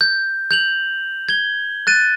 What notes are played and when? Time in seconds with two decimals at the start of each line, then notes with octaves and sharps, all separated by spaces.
0.01 G6
0.51 G6 F7 F#7
1.29 G#6 G7
1.87 F#6 A6 D#7